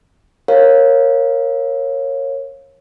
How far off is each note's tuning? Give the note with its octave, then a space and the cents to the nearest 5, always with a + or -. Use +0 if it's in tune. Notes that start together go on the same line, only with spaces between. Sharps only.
A#4 +0 C#5 -25 F5 +0